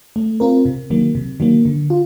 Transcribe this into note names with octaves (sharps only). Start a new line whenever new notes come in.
A3
C4 F4 A#4
C3
D#3 F#3 A#3
C3
D#3 F#3 A#3
D3
F4